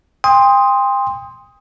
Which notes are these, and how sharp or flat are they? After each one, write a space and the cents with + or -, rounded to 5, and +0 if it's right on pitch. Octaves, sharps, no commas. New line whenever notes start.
G5 +40 C6 +0 D#6 +10